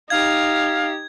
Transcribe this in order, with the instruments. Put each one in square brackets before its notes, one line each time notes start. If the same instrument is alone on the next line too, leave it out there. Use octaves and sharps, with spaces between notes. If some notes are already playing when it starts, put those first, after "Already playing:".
[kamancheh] D#4 G4 [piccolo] F5 [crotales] G#6